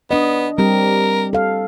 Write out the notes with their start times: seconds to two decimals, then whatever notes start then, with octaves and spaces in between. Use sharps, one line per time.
0.11 B3 D4 D#5
0.58 G3 C4 G4 A#4
1.33 A4 F5